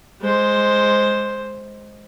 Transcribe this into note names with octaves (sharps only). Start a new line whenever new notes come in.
G#3 C5